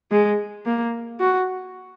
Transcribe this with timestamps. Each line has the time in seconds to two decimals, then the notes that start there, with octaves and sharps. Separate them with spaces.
0.11 G#3
0.65 A#3
1.20 F#4